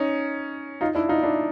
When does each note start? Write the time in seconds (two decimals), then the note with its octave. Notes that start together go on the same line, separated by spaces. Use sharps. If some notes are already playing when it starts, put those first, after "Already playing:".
Already playing: C#4 D#4
0.81 D#4 F4
0.95 D4 E4
1.09 D#4 F4
1.23 D4 E4